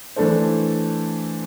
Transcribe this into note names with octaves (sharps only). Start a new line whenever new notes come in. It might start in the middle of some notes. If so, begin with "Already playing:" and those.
E3 A3 D4 A4 C5